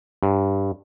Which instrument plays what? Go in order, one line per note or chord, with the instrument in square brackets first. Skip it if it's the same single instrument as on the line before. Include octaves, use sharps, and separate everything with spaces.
[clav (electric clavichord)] G2